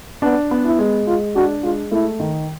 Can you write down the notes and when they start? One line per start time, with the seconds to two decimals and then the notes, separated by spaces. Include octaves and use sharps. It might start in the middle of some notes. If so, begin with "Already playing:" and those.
0.22 B3 D4
0.51 B3
0.65 E4
0.79 G#3
1.07 G#3 F4
1.36 D4 F#4
1.64 G#3 F4
1.92 A3 E4
2.20 D#3